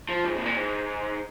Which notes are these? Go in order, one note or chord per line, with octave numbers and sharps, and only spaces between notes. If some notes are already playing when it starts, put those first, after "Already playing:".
F3
G#2
C3
A#2
G#2